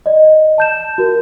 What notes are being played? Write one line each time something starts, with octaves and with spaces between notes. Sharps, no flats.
D5 D#5
A5 G6 E7
F#4 A#4